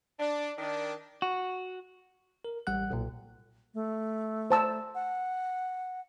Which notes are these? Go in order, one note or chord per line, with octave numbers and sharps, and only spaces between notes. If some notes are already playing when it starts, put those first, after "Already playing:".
D4
D#3 D4
F#4
A#4
A1 G3 F#5 F#6
B1 A#2
A3
C5 A5 E6
F#5